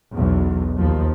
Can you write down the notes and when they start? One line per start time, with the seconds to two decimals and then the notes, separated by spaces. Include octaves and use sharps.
0.13 B1 E2
0.78 D#2 F3